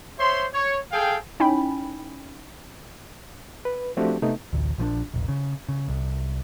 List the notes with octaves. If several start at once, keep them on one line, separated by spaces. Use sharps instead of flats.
C5 C#5 E5 C6
C#5
G#4 A4 F5 G5
C#4 D#4 E4 G5 G#5 B5
B4
F3 A3 C4 D4 F#4 G4
C3 A3 B3 D#4
A1 D2
A#1 F3 C#4 D4
E1 A#1
C#3
C#3
C2